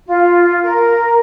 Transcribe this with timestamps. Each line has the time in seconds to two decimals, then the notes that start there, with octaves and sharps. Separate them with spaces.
0.07 F4
0.63 A#4